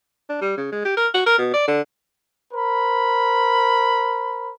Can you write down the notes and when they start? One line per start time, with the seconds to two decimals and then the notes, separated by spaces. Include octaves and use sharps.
0.29 D4
0.41 G3
0.57 C#3
0.72 G#3
0.85 G4
0.97 A#4
1.14 F#4
1.26 A#4
1.38 B2
1.53 D5
1.68 D3
2.53 A#4 C5 B5